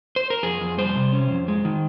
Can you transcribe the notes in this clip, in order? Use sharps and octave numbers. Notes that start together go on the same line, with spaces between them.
C5
A#4
F2 G#4
F2
G3 C5
C3
C#4
F2
G#3
D#3